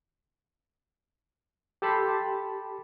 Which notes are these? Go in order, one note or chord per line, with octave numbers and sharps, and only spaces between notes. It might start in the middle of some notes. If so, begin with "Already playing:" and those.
G4 A4 A5 B5 C6